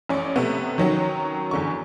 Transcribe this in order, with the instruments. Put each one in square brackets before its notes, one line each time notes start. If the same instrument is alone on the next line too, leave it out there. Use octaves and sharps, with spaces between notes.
[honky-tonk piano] A1 C#4 D5
C3 A3 B3
D#3 F#3 C#4
E2 D3 C#6